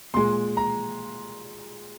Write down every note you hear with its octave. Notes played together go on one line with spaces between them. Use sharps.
A#2 G#3 C6
A#5